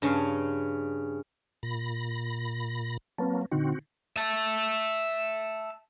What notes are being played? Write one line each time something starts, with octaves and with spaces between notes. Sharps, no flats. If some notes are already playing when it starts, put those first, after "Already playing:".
G2 C#3 C#4 F5
A#2 B5 A#6
F#3 A#3 C4 B4 A5
A#2 D3 C4 D#4 F#4
E5 A5